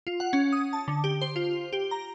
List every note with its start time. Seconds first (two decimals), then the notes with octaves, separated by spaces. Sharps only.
0.07 F4
0.20 F#5
0.33 C#4
0.53 D#6
0.73 A5
0.88 D3
1.04 G4
1.22 C5
1.36 F4
1.73 G4
1.91 A#5